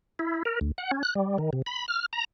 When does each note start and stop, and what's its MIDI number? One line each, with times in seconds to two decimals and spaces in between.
0.19 0.43 64
0.45 0.59 70
0.61 0.71 38
0.78 0.91 78
0.91 1.03 61
1.03 1.14 90
1.15 1.38 55
1.38 1.50 51
1.53 1.62 48
1.66 1.86 83
1.88 2.06 89
2.13 2.24 82